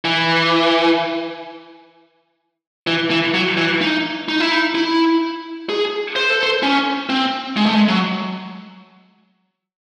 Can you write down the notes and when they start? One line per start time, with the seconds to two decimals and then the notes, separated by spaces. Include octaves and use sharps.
0.05 E3
2.87 E3
3.10 E3
3.34 F#3
3.57 E3
3.81 D#4
4.29 D#4
4.40 E4
4.52 D#4
4.75 E4
5.69 G#4
6.16 C5
6.30 A4
6.43 C5
6.63 C#4
7.09 C4
7.57 G#3
7.66 A3
7.75 G#3
7.88 F#3